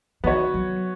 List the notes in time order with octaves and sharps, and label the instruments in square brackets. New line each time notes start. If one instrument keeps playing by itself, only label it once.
[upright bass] D#3 [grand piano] B3 F#4 C#5
[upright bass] F#3